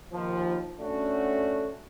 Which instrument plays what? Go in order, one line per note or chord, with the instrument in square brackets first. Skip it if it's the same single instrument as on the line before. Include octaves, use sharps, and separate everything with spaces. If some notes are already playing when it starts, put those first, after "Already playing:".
[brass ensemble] D#2 F3
A3 C#4 D4 F#4